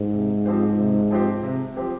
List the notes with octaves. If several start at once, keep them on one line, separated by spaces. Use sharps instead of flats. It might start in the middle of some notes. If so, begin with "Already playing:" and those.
Already playing: G#2
C3
F3 C4 G4 C5
C3
F3 C4 G4 C5
C3
F3 C4 G4 C5